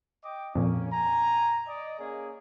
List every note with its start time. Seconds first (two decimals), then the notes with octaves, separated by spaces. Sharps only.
0.23 D#5 G5 D6
0.55 F2 A#2 A#3 C#4
0.91 G#5 A#5
1.68 D5 D#5
1.99 A#3 C#4 G#4